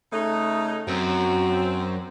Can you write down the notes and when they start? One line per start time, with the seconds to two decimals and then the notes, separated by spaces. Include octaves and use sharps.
0.13 C#3 A3 D#4
0.88 F#2 C4 F#4